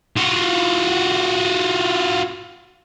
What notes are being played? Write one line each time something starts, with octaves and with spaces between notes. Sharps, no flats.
F4 F#4